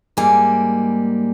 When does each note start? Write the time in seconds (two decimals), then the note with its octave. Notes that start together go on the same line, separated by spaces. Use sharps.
0.17 G#2 G3 A#3 G#5